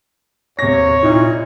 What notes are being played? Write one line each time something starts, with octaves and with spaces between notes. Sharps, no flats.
D#2 C3 C#5 A#6
A#2 D#4 E4